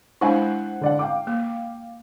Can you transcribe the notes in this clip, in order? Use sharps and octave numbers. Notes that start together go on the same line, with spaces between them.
G#3 D4 E4 C5 F#5 G#5
D3 D5 F#5
F5 G5 D6
A#3